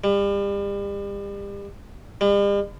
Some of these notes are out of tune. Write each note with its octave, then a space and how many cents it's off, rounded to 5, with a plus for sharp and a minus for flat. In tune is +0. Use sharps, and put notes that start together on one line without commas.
G3 +35
G3 +45